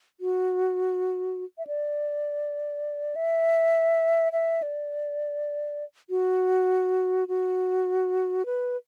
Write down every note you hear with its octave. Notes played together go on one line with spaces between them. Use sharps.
F#4
E5
D5
E5
E5
D5
F#4
F#4
B4